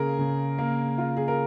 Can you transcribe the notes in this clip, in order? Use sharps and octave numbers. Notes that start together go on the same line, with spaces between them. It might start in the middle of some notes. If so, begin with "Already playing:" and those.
Already playing: C#3 A#3 G#4 A#4
C#3
A#3
F4
G#4
A#4